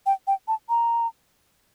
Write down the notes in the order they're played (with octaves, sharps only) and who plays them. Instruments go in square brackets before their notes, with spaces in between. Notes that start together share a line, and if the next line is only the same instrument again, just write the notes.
[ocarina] G5
G5
A5
A#5